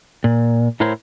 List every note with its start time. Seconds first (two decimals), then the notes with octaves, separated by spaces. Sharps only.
0.24 A#2
0.80 A2 E4 A#4 C5 C#5 A#5